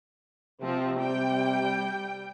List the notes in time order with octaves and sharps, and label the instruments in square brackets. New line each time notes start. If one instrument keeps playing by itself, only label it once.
[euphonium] C3 [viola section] F3 C4
[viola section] G3 G5